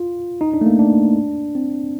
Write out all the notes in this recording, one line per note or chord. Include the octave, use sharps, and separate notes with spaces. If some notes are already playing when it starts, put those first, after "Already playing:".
Already playing: F4
D#4
D4
A3
A#3
D4
C4